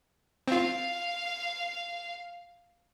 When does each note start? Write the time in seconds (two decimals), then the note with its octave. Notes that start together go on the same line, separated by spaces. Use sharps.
0.48 C4 F4 F5